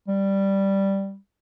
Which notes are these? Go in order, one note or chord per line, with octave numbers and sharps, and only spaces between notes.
G3